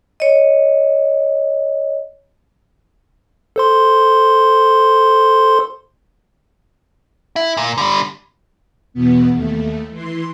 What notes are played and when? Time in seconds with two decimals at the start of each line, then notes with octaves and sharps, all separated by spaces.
0.20 C#5 D#5
3.56 A4 C5 C6
7.36 E4
7.57 A#2
7.78 D3 G3
8.94 E2 B2 B3
9.32 D#2 A3
9.91 E3 C6